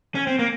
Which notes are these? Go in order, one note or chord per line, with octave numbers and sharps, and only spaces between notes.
C#4
C4
A#3